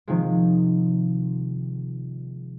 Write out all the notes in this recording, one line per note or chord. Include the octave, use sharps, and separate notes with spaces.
C3 D#3 F3 G#3